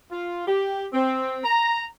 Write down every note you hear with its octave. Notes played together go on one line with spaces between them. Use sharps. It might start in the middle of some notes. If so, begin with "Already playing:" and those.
F4
G4
C4
A#5